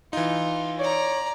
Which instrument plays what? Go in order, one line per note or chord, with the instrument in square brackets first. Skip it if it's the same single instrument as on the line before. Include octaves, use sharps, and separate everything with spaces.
[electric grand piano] E3 D#4 [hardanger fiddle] F4
[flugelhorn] C#5 [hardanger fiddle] D5 A#5